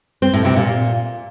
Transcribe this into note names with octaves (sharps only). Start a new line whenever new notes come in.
C4
A2
C3
A#2